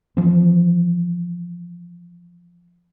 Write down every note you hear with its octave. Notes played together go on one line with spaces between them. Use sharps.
E3 F3 C4